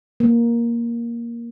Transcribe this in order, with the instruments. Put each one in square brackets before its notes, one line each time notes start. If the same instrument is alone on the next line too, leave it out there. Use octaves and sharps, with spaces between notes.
[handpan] A#3